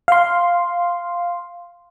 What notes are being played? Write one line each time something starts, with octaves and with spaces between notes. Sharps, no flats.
F5 C6